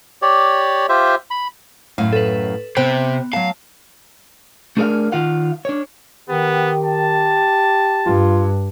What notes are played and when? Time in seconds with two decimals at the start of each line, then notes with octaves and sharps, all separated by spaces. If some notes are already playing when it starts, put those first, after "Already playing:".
0.22 G4 C#5 D5
0.89 F4 G4 C5 E5
1.31 B5
1.98 F#2 A2 F5
2.13 A4 B4
2.76 C3 B3 C5 G5
3.33 F#3 F5 A5
4.77 A3 D4 G#4 A#4 D5 F5
5.12 D#3 F4 F5 F#5
5.65 D4 C#5
6.29 D#3 B3 G4
6.83 A5
8.06 G2 F4